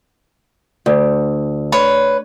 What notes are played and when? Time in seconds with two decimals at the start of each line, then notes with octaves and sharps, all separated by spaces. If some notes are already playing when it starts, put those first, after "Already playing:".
0.86 D2
1.72 B4 C#5